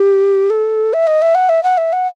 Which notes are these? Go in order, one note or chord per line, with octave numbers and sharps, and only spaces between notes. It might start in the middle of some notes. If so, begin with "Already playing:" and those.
Already playing: G4
A4
E5
D#5
E5
F#5
E5
F#5
E5
F#5